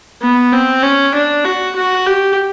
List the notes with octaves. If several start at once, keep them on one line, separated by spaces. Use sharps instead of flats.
B3
C4
C#4
D4
F#4
F#4
G4